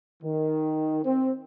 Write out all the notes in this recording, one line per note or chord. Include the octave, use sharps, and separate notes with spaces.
D#3
C4